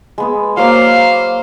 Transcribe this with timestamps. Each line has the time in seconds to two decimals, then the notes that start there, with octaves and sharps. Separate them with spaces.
0.18 G#3 B3 E6
0.57 F#3 A#3 C5 F5 D6